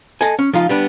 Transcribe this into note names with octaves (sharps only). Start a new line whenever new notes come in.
A4 D#5 G#5
C#4
F3 D#4 F4
G3 B3 D4